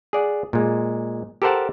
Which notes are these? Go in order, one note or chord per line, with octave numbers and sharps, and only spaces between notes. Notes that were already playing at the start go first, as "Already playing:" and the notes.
G#4 D5 F#5
A#2 G#3
G4 A4 A#4 C5 F#5 A5